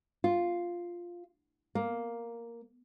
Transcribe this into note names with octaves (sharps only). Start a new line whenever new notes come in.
F4
A#3